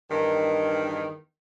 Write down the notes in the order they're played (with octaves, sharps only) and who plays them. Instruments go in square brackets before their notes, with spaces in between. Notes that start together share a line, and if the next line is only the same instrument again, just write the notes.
[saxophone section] E2 G2 D#3